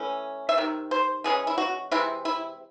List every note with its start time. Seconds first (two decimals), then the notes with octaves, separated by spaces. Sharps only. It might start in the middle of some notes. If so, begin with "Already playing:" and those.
Already playing: E3 A3 C#4
0.49 E5
0.58 C3 D#3
0.91 C5
1.24 E3 G#3 C#4 G#4
1.47 E4
1.58 F#4
1.91 C3 E3 G#3 C4 E4
2.25 E4